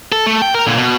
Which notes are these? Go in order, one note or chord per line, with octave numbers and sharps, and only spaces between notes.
A4
A3
G5
A#4
A#2 D3
B2